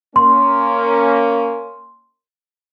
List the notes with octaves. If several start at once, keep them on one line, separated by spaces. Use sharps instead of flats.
A#3 C#4 C6